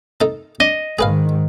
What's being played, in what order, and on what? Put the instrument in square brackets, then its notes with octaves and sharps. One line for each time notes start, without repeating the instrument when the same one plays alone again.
[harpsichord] D#4 A4
[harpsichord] D4 [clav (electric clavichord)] D#5
[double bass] G#2 D#3 [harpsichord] G#4 B4 F5